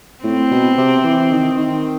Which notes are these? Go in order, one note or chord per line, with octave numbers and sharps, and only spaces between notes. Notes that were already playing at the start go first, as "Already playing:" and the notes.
A2 C4
B2
C3
E3
D#3
D#3